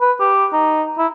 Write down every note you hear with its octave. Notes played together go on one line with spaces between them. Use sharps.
B4
G4
D#4
E4